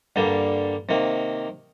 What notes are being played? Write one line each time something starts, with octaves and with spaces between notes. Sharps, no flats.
G2 D3 G3 A#3
C3 D#3 A#3